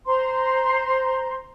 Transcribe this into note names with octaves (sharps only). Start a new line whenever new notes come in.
C5 A#5 C6